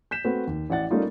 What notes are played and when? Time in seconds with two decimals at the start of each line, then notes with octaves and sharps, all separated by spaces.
0.11 G6 B6 E7
0.25 A3 C4 F#4 B4
0.47 D#2
0.70 A1 D5 F#5 A6
0.91 G3 A3 A#3 C#4 D#4 F4